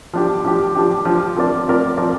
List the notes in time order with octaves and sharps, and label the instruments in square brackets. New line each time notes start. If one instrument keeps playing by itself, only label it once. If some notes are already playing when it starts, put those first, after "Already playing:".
[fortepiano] F3 D4 G4
F3 D4 G4
F3 D4 G4
F3 D4 G4
F3 C4 A#4 D5
F3 C4 A#4 D5
F3 C4 A#4 D5